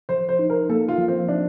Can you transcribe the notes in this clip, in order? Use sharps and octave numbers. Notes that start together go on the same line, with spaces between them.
F3 C5
C5
D#4
A#4
A#3 A4
F4
F3
C4
D4 D#4